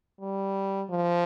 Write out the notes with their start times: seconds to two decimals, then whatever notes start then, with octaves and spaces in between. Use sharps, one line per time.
0.20 G3
0.90 F3